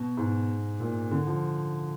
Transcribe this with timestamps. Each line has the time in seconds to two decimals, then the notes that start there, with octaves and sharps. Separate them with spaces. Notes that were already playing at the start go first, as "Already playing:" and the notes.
Already playing: B2
0.17 G#2
0.80 A#2
1.11 D3
1.27 F3